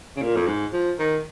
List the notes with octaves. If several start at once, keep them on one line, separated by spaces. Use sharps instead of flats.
C#3
A#2
F2
G#2
F3
D#3